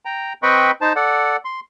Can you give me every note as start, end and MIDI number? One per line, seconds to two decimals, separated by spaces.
0.05 0.33 79
0.05 0.33 82
0.43 0.71 60
0.43 0.71 71
0.43 0.71 75
0.43 0.71 79
0.43 0.71 83
0.43 0.71 85
0.81 0.93 63
0.81 0.93 72
0.81 0.93 81
0.96 1.36 69
0.96 1.36 74
0.96 1.36 78
1.45 1.60 84